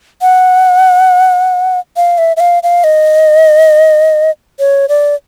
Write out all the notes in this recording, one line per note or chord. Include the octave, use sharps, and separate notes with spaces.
F#5
F5
E5
E5
F5
F5
D#5
C#5
D5